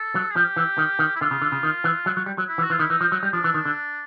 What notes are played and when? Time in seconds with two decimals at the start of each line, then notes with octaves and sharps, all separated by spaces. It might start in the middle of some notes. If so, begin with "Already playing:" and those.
Already playing: A4
0.15 F#3
0.30 G#4
0.36 F3 G4
0.56 E3
0.78 D#3
0.99 D#3
1.16 E4
1.21 D3 F4
1.31 C#3
1.42 D3
1.52 C#3
1.63 D#3
1.84 E3
2.06 F#3
2.17 F#3
2.26 G3
2.38 F#3
2.48 E4
2.58 E3
2.63 F#4
2.70 E3 F4
2.79 D#3 E4
2.90 E3 D#4
3.01 F3
3.12 F#3
3.23 G3
3.33 F3 D4
3.44 E3
3.54 D#3
3.65 D3